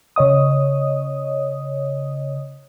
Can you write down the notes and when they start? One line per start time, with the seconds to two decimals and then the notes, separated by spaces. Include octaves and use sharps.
0.16 C#3 C#5 D#5 D#6